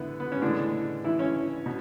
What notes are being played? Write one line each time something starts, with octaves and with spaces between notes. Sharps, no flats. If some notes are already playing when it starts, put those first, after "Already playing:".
Already playing: D3 E3 B3 E4
B3
C#4
A2 D3 E3 G#3 D4
E3 E4
C#4 C#5
B2